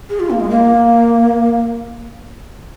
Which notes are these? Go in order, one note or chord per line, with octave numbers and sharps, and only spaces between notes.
G#4
F4
A#3
G#3
A#3